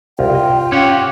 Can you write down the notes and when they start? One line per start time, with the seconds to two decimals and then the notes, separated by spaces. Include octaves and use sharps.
0.19 C2 F4 G5
0.35 D#5
0.72 C#4 G4 C#5 F#5